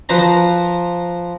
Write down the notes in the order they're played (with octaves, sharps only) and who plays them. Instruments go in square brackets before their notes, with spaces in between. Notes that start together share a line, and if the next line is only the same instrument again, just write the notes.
[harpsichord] F3 B4 C5 A#5